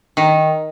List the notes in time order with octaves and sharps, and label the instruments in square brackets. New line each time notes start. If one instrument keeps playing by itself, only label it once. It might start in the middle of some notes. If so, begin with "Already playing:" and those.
[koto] D#3